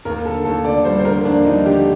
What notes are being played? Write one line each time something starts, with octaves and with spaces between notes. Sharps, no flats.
D#2 A#4
D3 A4
D#2 A4
D3 D5
G3 C5
C5
D3 A#4
D#2 D4
G3 D#4
D3 G4